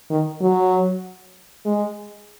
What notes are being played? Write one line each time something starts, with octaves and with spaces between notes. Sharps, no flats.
D#3
F#3
G#3